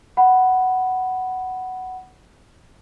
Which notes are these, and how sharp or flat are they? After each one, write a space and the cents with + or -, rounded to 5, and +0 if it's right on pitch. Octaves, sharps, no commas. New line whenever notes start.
F#5 +10 B5 +0